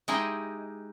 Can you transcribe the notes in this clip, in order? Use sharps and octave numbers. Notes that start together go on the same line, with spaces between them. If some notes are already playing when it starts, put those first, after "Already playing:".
G#3 D#4 E4 G4 D#5